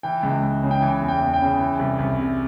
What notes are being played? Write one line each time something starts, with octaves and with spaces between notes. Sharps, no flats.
E3 G5
C#2
C#2
C#3
G5
E3 G#5
E2
G5
E2
G5
C#3
E3
C2
C2
C3